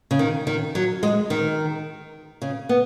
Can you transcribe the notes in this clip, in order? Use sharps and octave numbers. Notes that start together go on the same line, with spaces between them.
C#3
D#3
D#3
F#3
G#3
D#3
C#3
B3